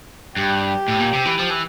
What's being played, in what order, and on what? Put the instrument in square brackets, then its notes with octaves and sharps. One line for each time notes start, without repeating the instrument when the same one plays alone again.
[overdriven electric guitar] G2 [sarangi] G4
[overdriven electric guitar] A2
A#2
C3
E3
F3
E3